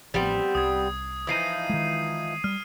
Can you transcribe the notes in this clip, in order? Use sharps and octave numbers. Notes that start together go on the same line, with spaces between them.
A1 F3 G3 B3 C4
C2 D#6 G#6
E3 F3 D#4 D#6 C7 D#7
D#3 G#3
G3 F6